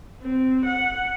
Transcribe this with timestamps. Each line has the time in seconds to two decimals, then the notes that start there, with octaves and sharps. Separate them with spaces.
0.22 C4
0.65 F#5